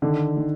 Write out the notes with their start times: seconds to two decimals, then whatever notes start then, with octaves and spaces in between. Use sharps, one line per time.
0.02 D3 D#3
0.37 D#3